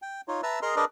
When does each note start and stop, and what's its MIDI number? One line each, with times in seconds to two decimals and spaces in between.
0.02 0.21 79
0.28 0.41 63
0.28 0.41 65
0.28 0.41 73
0.43 0.59 71
0.43 0.59 76
0.43 0.59 81
0.43 0.59 82
0.43 0.59 88
0.62 0.76 68
0.62 0.76 70
0.62 0.76 75
0.62 0.76 82
0.62 0.76 84
0.76 0.85 62
0.76 0.85 68
0.76 0.85 70
0.76 0.85 71
0.76 0.85 74
0.76 0.85 75